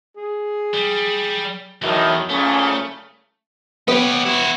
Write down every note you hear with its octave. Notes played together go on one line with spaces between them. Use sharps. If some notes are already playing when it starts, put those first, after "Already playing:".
G#4
G3
E2 A2 D#3 E3 F#3
C2 A#2 C#3 A3 C#4
B3 G4 C#5
E4 F#4